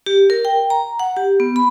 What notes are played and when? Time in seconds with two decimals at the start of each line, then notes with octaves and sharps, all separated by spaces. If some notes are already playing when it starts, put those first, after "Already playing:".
0.06 G4
0.30 A#4
0.45 G5
0.70 A#5
1.00 F#5
1.17 G4
1.40 B3
1.56 B5